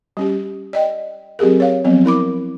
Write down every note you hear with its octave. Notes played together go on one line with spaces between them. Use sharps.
G3 C#4 G4
D5 D#5 G5
F#3 C4 G4 G#4 A#4
C#5 F5
F3 F#3 B3 C4
E4 A#4 B5 D6